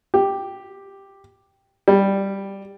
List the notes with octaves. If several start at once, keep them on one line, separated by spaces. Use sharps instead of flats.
G4
G3